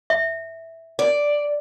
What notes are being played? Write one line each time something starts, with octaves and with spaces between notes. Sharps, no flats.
E5
D5